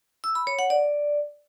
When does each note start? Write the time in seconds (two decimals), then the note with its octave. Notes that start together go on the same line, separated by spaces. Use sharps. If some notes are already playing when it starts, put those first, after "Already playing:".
0.24 E6
0.35 B5
0.47 C#5
0.59 F#5
0.70 D5